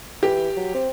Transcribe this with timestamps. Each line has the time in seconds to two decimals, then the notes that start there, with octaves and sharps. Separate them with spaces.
0.23 E3 G4
0.57 F#3
0.74 C4